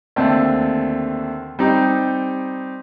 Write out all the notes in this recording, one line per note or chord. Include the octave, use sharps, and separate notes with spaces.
D#2 D3 A3 C4
G3 C4 D#4